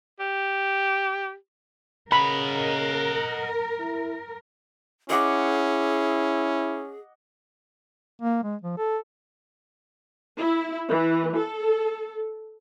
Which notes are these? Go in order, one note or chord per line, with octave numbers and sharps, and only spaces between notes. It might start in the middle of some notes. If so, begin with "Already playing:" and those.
G4
C#3 A#4 D#5 F#5 B5
E4
C#4 E4 G#4 D#5 F#5 D6
A#3
G#3
F3
A4
E4
E3
A4